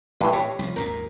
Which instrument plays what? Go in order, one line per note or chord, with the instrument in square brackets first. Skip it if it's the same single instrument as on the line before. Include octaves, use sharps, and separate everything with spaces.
[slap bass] A1 D2 [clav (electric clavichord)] G2 E3
[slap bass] A2 [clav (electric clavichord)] G4 C#5
[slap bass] C2 F3
[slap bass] G#1 D#2 A#2 [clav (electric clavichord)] A#4